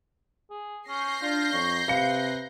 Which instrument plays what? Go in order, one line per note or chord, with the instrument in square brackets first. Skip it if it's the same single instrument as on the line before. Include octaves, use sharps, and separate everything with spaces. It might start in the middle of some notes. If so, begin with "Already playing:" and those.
[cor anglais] G#4
[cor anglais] C#4 [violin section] G6 A#6 C7
[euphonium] D4 [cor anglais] F4
[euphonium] F2 [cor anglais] C#5
[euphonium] C3 [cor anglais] B4 [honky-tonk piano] F5 C#7